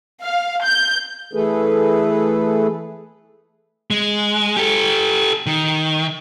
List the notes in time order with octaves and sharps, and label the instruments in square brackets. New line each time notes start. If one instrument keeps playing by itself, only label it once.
[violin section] F5
G6
[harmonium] E3 A3 G#4 A4 B4
[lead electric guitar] G#3
G4 A4
D#3